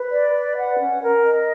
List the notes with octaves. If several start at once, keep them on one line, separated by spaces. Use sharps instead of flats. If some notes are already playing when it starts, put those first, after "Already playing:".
Already playing: B4
D5
B4
F#5
C#4
A#4
D#5